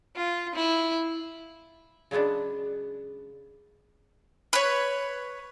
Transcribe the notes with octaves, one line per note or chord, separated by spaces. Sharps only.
F4
E4
C#3 F#3 G#3 B3 D4
B4 C#5